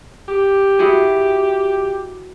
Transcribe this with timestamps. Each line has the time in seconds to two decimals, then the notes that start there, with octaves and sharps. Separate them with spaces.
0.28 G4
0.79 E4 F#4 G#4